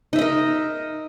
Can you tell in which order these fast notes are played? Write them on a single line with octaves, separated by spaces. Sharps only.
D#4 E5 D#5 A#4